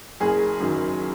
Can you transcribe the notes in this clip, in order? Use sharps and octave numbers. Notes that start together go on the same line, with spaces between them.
F#1 G#4
F#2 D#3